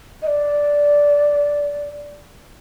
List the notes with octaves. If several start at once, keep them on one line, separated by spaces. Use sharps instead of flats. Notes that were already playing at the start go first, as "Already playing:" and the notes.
D#5
D5